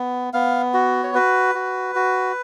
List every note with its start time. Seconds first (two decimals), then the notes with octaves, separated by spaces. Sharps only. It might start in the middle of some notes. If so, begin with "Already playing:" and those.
Already playing: B3
0.33 B3 F5
0.74 F#4
1.03 C#5
1.15 F#4 B4
1.55 F#4
1.95 F#4